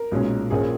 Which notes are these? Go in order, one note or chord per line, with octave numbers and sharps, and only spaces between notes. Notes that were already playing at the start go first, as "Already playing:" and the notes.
Already playing: A#4
B1 A#2 G#3 C#4
A#1 A#2 A#3 C#4 G#4